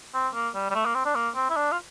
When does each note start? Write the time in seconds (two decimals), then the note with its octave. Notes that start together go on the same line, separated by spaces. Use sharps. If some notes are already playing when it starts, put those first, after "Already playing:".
0.14 C4
0.34 A#3
0.55 G3
0.71 G3
0.75 A3
0.85 A#3
0.95 C4
1.05 D4
1.15 A#3
1.35 C4
1.50 E4
1.56 D4
1.72 F4